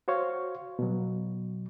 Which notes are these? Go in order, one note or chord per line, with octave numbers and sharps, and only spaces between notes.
F#4 C5 C#5 F5
B2 F#3